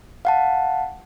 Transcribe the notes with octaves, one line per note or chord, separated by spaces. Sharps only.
F5 F#5 A5